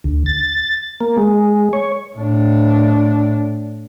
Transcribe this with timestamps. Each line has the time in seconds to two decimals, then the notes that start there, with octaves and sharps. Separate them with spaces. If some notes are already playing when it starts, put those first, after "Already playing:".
0.04 D2
0.26 A6
1.01 A#3
1.18 G#3
1.73 C#5
2.17 A2 D4